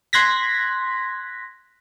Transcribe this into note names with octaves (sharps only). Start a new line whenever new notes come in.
C6 F#6 G#6 A#6 B6